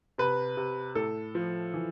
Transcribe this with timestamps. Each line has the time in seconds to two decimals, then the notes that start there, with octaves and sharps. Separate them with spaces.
0.18 C3 B4
0.57 C3
0.95 A2 A4
1.35 F3
1.74 E3